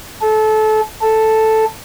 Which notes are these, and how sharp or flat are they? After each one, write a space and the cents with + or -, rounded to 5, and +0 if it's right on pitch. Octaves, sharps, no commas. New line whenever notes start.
A4 -25
A4 +0